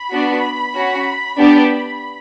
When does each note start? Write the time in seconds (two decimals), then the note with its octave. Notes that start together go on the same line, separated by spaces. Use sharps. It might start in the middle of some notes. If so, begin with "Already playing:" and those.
Already playing: B5
0.11 B3 D4 F#4
0.74 C#4 F#4
1.38 B3 D4 G4